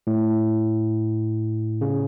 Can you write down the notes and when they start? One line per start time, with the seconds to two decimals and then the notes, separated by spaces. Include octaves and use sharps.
0.07 A2
1.81 C#3